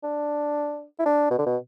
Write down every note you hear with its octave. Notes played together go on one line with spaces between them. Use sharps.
D4
E4
D4
B2
D3
B2